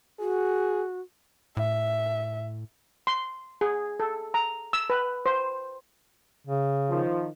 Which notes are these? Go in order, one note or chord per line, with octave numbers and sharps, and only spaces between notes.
F#4 G#4
A2 E5
C6
G#4
A4
A#5
E6
B4
C5
C#3
D#3 F3